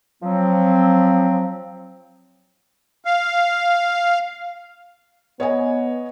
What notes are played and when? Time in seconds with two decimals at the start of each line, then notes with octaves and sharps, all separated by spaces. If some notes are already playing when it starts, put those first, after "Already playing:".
0.23 F3 F#3 C4
3.04 F5
5.40 B3 C#5 D#5 G#5